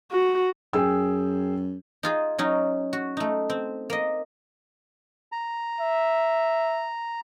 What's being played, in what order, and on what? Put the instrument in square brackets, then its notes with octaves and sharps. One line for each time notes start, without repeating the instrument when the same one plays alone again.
[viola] F#4
[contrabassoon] F#2 [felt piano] G#4 G5 E6
[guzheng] D#4 F4 G#4
F#3 C#4 D#4
F#4
A3 D#4
C4
A#3 D#5
[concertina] A#5
[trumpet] E5